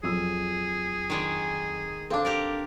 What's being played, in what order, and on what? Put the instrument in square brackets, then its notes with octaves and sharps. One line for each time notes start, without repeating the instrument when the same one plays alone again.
[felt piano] F2 F#3 E6 [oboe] G#4
[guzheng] D#3 G#3 D5
[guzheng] C4 D4 [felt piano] A4 F5 D6
[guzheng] G4 A#4 D5